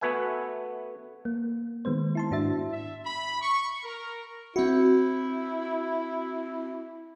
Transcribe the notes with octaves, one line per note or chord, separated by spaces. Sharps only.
A3 B3 F#4 B4 E5 G#5
A#3
D#3 G#3 B3 C5
E4 A5 C6
G#2 D4 F#4 E5 A6
E5
B5
C#6
A#4
C4 E4 F#4